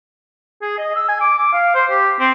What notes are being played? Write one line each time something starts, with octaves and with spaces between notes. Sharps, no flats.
G#4
D#5
E6
G#5
D6
D6
F5
C5
G4
C4